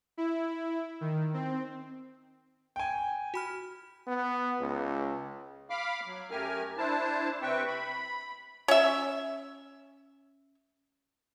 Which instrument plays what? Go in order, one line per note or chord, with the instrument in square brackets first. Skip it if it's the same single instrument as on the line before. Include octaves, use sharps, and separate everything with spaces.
[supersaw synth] E4
D#3
C4
[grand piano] G5 G#5
[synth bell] F#4 B5 F6
[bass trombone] B3
C#2
[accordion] F5 B5 D6 F6
F#3
F#2 A3 G4 A#4 G#5 F6
D4 E4 C5 A5
C3 C4 B4 E5 G5 C#6
B5
[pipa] C#4 E5